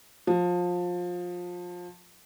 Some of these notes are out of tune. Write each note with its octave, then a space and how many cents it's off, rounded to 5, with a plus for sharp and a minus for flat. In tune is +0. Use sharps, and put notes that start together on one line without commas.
F3 +25